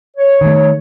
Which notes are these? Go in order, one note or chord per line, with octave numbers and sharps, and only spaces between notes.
C#5
D#3 A3